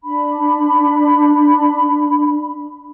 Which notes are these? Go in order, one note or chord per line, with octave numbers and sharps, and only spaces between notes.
D4 B5